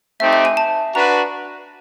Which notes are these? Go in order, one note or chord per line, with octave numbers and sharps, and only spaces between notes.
A3 C4 D#4 G4 E5
E5
G#5
A5
D4 F#4 B4 A#5